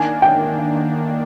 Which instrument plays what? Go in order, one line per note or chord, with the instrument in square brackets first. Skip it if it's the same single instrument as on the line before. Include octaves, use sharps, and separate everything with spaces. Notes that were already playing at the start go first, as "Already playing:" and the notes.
Already playing: [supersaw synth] D#3 A#3 D4 [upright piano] G#5
[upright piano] G5